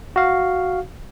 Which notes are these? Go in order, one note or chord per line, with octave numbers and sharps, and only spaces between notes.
F#4 F5